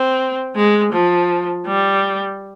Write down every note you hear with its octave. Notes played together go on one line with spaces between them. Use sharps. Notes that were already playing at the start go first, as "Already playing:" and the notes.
Already playing: C4
G#3
F3
G3